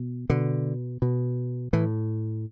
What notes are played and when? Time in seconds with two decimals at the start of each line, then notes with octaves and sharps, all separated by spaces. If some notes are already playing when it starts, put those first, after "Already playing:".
Already playing: B2
0.30 B2 D3
1.02 B2
1.73 A2 E3